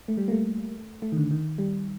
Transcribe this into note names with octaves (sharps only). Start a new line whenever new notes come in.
A3
G3
A#3
A3
A3
D#3
D3
D#3
G3